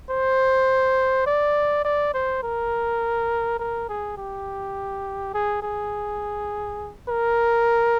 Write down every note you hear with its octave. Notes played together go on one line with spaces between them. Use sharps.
C5
D5
D5
C5
A#4
A#4
G#4
G4
G#4
G#4
A#4